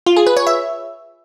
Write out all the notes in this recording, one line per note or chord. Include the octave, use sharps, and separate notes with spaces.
F4
G#4
B4
C#5
E5